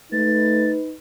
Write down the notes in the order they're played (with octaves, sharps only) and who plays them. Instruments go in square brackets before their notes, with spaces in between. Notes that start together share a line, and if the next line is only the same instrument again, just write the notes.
[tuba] A3 [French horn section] D#4 B4 [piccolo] A6